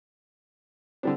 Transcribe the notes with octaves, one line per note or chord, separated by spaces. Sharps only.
D3 G3 C4 D4